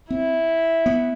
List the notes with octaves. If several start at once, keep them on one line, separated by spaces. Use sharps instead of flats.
C4 E4
B3